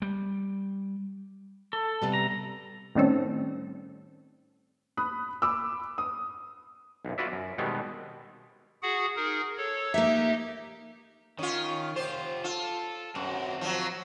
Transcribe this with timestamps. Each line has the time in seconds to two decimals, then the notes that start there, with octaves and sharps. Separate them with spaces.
0.02 G3
1.73 A4
2.02 C3 G3 B3
2.13 A#5
2.95 A2 D#3 G3 C4 C#4 A4
4.97 B5 D#6 F#6
5.42 B5 D6 E6
5.98 D#6
7.05 B1 F#2
7.18 F4 F#4 B4 D5 E5
7.32 F#2
7.58 B2 D#3 G3 G#3 B3 C4
8.82 F#4 G#4 F#5
9.16 D#4 G#4 A#4
9.58 A4 C#5
9.94 A#3 D#4 G4 E5
11.39 D#3 C#4 F4
11.96 F4 G4 C5
12.44 F4 A4
13.15 F#2 C4 F#4
13.61 F3 F#3